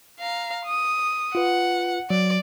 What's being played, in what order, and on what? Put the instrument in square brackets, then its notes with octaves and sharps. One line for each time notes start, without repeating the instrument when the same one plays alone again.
[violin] F5 A#5
D#6
[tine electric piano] F4 B4 [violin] F#5
[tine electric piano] F#3 [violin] D5